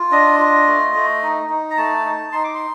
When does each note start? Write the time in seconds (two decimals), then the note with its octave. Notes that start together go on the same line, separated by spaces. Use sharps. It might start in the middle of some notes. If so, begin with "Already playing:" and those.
Already playing: F4
0.11 D4 D#5
0.39 F4
0.67 A3
0.95 A3
1.23 D#4
1.50 D#4
1.70 A#5
1.77 A3 A5
2.05 D#4
2.32 D#4 C6
2.44 D6
2.54 C6